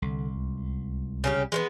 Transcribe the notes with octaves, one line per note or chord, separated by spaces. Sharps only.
C2 D3
C#2
C#3 C#4 G4
E3 G#3 A3 B3